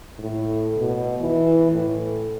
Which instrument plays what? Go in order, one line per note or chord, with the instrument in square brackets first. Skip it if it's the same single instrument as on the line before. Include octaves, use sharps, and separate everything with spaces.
[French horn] A2
B2
E3
A2